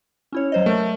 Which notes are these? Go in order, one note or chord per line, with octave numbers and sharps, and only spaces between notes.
C#4 E4 C#5
F#3 C5 D#5
A3 A#4